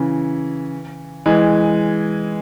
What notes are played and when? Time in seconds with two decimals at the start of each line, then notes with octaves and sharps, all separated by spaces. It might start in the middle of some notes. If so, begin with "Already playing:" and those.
Already playing: C#3 E3
1.26 E3 G#3